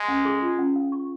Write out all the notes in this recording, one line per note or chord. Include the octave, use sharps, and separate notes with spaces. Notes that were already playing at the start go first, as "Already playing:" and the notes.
Already playing: G#3
C#4
G#4
F4
C#4
F5
C#6